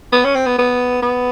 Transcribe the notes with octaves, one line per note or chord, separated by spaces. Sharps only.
B3
C#4
C4
B3
B3
B3